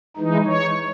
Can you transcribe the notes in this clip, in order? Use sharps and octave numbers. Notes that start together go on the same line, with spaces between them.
E3 G#3 D#4
C#5